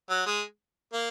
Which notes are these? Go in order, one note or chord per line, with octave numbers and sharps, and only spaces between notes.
F#3
G#3
A#3